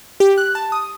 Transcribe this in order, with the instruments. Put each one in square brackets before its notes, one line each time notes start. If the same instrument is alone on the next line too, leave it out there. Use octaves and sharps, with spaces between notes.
[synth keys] G4
F#6
A5
D#6